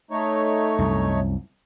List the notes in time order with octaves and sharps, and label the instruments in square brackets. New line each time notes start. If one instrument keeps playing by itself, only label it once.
[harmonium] A3 D#4 C#5
[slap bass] C2 F#2